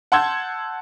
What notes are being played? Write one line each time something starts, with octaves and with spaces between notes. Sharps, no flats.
F#5 A5 C6 E6 G6 G#6